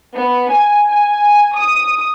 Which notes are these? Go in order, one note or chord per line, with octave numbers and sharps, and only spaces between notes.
B3
G#5
G#5
D#6